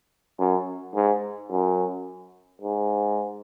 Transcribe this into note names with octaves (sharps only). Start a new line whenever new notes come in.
F#2
G#2
F#2
G#2